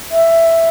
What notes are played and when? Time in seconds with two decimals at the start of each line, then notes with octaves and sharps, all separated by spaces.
0.11 E5